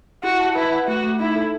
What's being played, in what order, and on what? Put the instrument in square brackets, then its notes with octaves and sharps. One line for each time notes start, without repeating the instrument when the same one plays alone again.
[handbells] E4 [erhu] F#4
[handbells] A5
[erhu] E4 [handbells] B4
[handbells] F#5
[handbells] A3 [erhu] F#4
[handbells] A3
[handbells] D#4 [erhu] E4
[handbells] A4